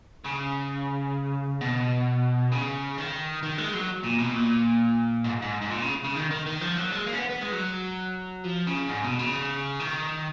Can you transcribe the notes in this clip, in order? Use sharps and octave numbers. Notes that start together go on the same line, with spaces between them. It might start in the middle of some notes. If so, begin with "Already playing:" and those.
C#3
B2
C#3
D#3
D#3
G#3
F#3
A#2
B2
A#2
G#2
G#2
G#2
A#2
C#3
C#3
D#3
D#3
D#3
F3
F#3
G#3
A#3
C#4
B3
B3
G#3
F#3
F3
C#3
G#2
B2
C#3
D#3